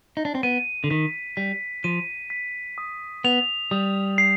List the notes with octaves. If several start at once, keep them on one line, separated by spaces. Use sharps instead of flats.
D#4
D4
C4
B3 D#7
D3
D#3 B6
G3 B6
F3 D#7
B6
D#6
B3 F7
G3 D#6
C7